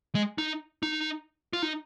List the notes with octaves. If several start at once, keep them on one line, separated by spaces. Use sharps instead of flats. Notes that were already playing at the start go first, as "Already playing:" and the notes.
G#3
D#4
D#4
F4
D#4